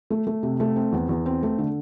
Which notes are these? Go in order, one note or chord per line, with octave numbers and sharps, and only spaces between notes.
A3
A3
C3
A3
C4
E2
E2
C4
A3
D3